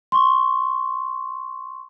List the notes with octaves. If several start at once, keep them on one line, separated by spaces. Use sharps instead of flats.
C6 C#6